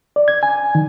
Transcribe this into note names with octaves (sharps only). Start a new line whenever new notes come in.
D5
G#6
G#5
D#3